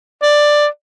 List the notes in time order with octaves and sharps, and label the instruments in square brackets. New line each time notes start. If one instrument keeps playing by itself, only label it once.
[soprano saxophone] D5